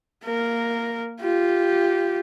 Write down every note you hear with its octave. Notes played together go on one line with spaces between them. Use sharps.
A#3 A#4
F4 G4